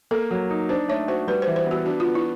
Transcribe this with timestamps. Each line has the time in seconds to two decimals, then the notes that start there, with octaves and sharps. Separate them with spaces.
0.11 A#3 A4
0.31 F#3
0.50 D#4
0.69 D4 C5
0.88 A3 C#5
1.08 F#4 C5
1.27 G3 B4
1.42 C5
1.47 E3
1.56 C5
1.66 B3 F#4
1.86 D4 F#4
2.00 F4
2.05 B3
2.15 E4